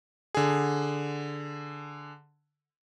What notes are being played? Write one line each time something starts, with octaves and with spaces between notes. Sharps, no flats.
D3 G#4